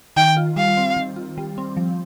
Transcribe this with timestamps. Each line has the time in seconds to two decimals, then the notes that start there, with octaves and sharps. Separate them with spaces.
0.16 D#3 G5
0.37 F4
0.56 G3 F5
0.77 C4
0.96 D#3
1.16 F4
1.38 G3
1.58 C4
1.77 F3